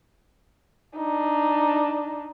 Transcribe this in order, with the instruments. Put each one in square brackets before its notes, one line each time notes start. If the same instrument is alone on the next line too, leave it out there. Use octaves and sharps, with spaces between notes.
[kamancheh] D4 D#4